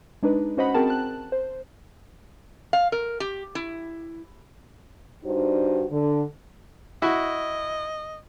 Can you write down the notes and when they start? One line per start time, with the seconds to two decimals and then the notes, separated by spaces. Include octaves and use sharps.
0.23 G#3 D4 D#4 B4
0.57 C#4 F#4 C5 D#5 F#5 B5
0.74 C4 F#4 G#4 A#4 G5 A5
0.87 A5 F#6
1.32 C5
2.73 F5
2.92 A#4
3.20 G4
3.55 E4
5.25 G2 D4 D#4 F#4 C5
5.90 D3
7.02 E4 F#4 D#5